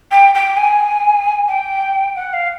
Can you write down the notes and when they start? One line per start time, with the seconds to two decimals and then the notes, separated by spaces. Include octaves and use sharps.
0.11 G5
0.35 G5
0.57 G#5
1.48 G5
2.16 F#5
2.33 F5